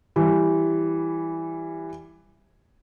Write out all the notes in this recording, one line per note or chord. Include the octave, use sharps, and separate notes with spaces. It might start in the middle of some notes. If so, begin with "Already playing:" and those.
E3 G3